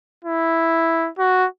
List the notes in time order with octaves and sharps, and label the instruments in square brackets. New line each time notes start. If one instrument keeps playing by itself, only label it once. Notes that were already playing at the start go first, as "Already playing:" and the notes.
[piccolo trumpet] E4
F#4